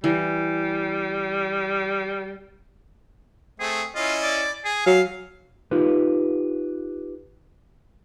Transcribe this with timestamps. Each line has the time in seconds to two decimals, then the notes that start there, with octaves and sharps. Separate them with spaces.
0.04 E3 G3
3.60 A3 C4 G#4
3.96 C#4 E4 F4 D#5
4.22 D5
4.65 G#4 G#5
4.86 F#3 F5
5.71 D#4 F4 G4 B4